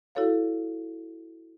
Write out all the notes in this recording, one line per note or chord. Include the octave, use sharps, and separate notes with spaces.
E4 F#4 A4 C#5 F5